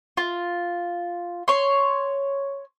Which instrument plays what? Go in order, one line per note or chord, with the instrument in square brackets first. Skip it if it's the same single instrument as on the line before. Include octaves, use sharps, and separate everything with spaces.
[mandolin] F4
C#5 C6